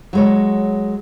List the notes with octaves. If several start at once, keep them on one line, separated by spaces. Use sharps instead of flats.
F#3 G#3 C#5